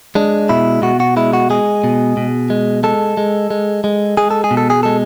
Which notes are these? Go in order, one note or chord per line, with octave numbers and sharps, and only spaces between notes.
G#3 D4
B2 E4
B2 F#4
F#4
G#3 E4
F#4
G#3 G#4
B2
B2
G#3
G#3 A4
G#3
G#3
G#3
G#3 G#4
A4
G#4
B2
A4
G#4
G#3 A4